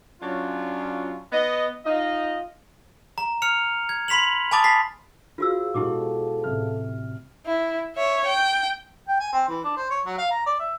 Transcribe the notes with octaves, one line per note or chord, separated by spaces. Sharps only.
F#3 C#4 D4 F4
B3 D#5
D#4 F4 D#5
A#5
F6 C#7 F7
G#6
B5 C6 B6 F7 F#7
G#5 A5 B5 D6 D#6 A6
A5 B6 C7
F4 F#4 G#4 C5 F5 E6
B2 G#3 E4 F#4 G4 A4 D6
A1 C3 F6
E4
C#5 E5
G5
G5
G#5
C4
E3
D4
C5
C#5
F#3
F5
A#5
D5
E5